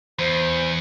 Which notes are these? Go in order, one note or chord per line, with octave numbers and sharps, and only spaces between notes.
E2 C5